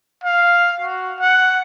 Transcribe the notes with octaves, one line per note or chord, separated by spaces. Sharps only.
F5
F#4
F#5